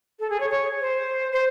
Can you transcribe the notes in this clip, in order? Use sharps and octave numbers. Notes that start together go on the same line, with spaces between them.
A4
G#4
C#5
C#5
C5
C5